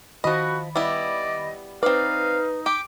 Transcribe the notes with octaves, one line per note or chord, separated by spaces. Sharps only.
D#3 F3 F#4 D#5 B5
G3 B3 E4 D5 D#5
C4 D#4 B4 D5 F5
G4 D6